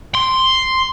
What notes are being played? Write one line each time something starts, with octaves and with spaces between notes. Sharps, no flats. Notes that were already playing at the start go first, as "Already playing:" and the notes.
C6